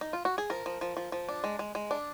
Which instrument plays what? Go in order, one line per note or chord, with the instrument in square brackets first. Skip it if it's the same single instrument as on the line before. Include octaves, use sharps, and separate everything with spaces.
[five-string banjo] D#4
F4
F#4
G#4
F3 A#4
F3
F3
F3
F3
D4
G#3
G#3
G#3
D4